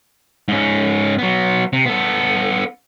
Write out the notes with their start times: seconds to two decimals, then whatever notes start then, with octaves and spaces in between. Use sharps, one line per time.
0.48 G#2 C#4
1.18 F#3 B3
1.73 C3
1.86 B3 A4